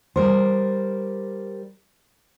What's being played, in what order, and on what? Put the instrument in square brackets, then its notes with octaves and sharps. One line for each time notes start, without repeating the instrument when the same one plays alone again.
[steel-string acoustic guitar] G3 A#4 C5